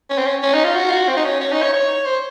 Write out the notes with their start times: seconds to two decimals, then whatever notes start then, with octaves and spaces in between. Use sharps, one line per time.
0.10 C#4
0.18 C4
0.27 C#4
0.43 C#4
0.53 D#4
0.64 F4
0.76 F#4
0.89 F4
0.92 F#4
1.09 C4
1.17 D#4
1.25 C#4
1.41 C#4
1.52 D#4
1.63 C#5
1.73 C#5
2.06 C5